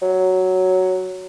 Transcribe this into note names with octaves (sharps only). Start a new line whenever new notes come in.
F#3